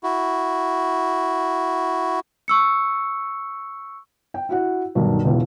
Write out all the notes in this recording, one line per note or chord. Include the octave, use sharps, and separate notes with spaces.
E4 F#4
C#6 E6 C#7
G5
E4 F#4 F#5
B1 G2 D#3
E1 C#2 E4